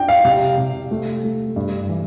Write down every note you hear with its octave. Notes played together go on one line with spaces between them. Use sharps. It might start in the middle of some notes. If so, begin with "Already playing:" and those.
Already playing: D4 G5
F5
C3 F5
C3
A3
A3
G2
E3